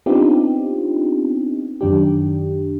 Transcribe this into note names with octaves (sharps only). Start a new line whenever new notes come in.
B3 C4 D4 D#4 F4 G4
F#2 D#3 D4 G4